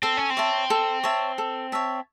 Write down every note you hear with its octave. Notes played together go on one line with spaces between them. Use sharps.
C4 A4
C#4
C4
C#5 E5 A5
A4
C#5 E5 A5
A4
C#5 E5 A5